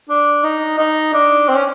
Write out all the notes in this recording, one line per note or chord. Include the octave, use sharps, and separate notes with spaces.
D4
D#4
D#4
D4
C4
C#4